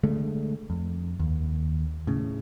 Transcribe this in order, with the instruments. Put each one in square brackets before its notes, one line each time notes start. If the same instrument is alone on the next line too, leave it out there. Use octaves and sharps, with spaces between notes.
[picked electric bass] D3 G#3 A3
F2
D#2
A2 C#3